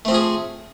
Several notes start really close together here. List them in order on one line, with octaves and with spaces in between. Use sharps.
A3 C4 F3 G#4